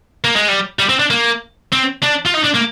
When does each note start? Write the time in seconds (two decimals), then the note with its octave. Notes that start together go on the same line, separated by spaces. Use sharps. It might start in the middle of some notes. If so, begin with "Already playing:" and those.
0.24 A#3
0.36 G#3
0.49 G3
0.79 G3
0.90 C4
0.99 D4
1.11 A#3
1.73 C4
2.03 D4
2.26 F4
2.35 D#4
2.45 D4
2.55 A#3